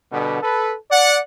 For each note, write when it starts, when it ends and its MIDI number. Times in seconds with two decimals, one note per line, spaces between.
0.12 0.40 47
0.12 0.40 50
0.12 0.40 55
0.12 0.40 59
0.42 0.73 69
0.42 0.73 71
0.91 1.19 74
0.91 1.19 78